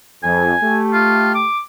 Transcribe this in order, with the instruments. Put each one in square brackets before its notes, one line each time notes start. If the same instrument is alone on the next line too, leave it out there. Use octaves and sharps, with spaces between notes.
[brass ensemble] F2 [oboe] G#5
[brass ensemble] A3 G4
[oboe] F4
D6